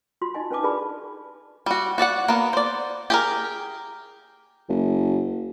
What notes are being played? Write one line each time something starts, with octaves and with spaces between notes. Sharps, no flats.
F4 F#4 C6
D#4 D#5 G#5
C#4 B4 G#5 A5 D6
D4 G4 G#4 B4 D5 B5
G3 F#4
F#4 D5 E5 F#5
A#3 B3
C5 D5
G4 G#4 A#4
F#1